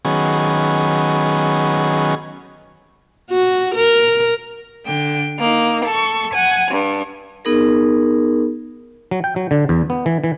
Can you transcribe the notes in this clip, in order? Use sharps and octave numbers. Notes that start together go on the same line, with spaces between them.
D#3 F#3 B3 C#4 G#4
F#4
A#4
D3 G5
A#3 D#4
A4 C#6
F#5 G#5
G2
B3 D#4 G#4 A#4
F#3
G5
F#3
D3
E2
B3
E3
E3